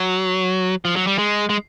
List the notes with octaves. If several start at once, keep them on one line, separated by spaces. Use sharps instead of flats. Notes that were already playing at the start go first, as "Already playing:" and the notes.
Already playing: F#3
F3
F#3
G3
G#3
G#3